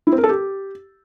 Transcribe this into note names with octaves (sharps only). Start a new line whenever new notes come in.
E4
C4
A#4
A4
G4